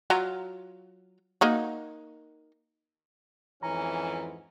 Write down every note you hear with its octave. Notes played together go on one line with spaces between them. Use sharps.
F#3 F4 A#5
A#3 D#4 F#4
F2 G#2 E3 C#4 A#5